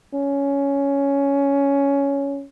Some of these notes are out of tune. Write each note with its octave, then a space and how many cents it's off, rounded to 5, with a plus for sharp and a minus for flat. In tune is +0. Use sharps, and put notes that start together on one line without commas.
C#4 +10